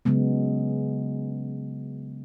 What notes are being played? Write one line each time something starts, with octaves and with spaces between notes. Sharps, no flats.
C#3 F#3 G#3 B3